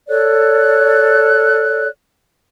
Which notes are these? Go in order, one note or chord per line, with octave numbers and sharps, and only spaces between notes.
A4 C#5 D5 F#6